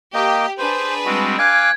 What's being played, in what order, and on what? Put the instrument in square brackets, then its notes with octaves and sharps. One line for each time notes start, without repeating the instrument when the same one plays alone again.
[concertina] A#3 D#5 G5 [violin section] G4
[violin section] D4 G#4 B4 [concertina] C5
[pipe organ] G3 G#3 C4 [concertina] F#4
[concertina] F5 G#5 D6 [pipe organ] G5 F#6 [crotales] G#6